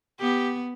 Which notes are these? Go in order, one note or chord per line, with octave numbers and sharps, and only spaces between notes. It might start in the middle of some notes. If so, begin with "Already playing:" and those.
B3 G4